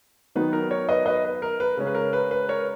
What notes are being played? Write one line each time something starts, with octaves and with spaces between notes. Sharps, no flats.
D#3 F#3 B3 D#4 B4
A#4
A#4 C#5
B4 D#5
B4 D#5
B4
A#4
B4
C#3 G#3 C#4
B4
A#4
B4
B4
A#4 C#5